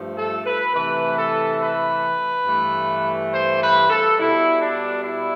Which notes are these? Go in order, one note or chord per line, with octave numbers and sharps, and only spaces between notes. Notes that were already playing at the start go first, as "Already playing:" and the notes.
Already playing: G2 F3 A3
A4
B4
C3 E3 A3 B4
A4
B4
G2 E3 A3
C5
B4
A4
B2 G3 E4
D4
E4